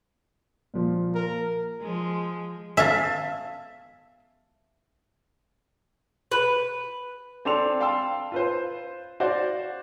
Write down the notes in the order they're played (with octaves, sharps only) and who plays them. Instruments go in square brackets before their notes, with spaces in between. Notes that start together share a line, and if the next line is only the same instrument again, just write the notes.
[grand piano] A#2 F3
[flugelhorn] A#4
[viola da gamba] F3 G#3
[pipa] A4 F5 G#5 [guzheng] E5
[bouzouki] B4
[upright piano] C4 D4 A4 C6 F7
F5 G5 A5 C6 E6
F4 B4 C5
F#4 C5 D5 F5